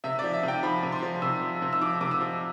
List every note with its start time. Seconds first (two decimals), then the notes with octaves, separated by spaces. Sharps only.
0.04 C3 E5
0.19 F3 D5
0.33 E5
0.43 C3 G5
0.63 F3 B5
0.83 C3
0.92 C6
1.03 F3
1.22 C3 E6
1.42 F3
1.62 C3
1.73 E6
1.81 F3 D6
2.01 C3 D6
2.11 E6
2.21 F3